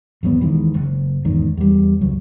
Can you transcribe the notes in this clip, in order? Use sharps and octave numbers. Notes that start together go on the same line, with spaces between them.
G#1 E2 F#3 B3
D#2 D#3 E3 G#3
F#1
E2 G#2 D#3
E2 G3
C#2 F#2 F#3